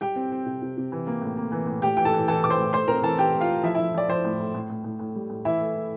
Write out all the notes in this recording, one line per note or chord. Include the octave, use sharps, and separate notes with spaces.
G3 G4 G5
C4
C4
C3
C3
C3
E3
A#3
A2
A#3
E3
A2
A2 G4 G5
E3 G5
A4 A5
E3
E3 A4 A5
E3 D6
C5 C6
A2
A3 C5 C6
C4 A#4 A#5
E3 A4 A5
E3 G4 G5
A3
F4 F5
A3
F3 E4 E5
F3 E4 E5
F3 D5
F3 C5
A2
A2
A2
A2
A2
A2
G3
A2
E3 E4 E5
A3
A3